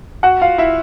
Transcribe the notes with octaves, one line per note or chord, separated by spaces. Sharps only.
F#4 F#5
F4 F5
E4 E5